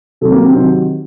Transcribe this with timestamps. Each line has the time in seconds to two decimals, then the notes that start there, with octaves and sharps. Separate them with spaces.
0.21 C3 D#3 F#3 A4
0.32 A#3
0.42 C4
0.52 C3 D#3 F#3 C4